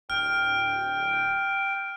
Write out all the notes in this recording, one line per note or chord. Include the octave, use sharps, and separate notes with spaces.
D1 G5 F6